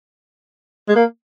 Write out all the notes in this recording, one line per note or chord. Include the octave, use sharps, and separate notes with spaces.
G#3
A#3